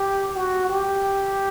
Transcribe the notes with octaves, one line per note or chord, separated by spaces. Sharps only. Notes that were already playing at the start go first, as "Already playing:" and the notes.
Already playing: G4
F#4
G4